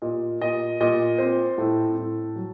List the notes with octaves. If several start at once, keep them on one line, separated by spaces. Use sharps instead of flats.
A#2 D#5
A#2 D#5
A#2 D#5
C4 C5
A2 A4
A2
F#3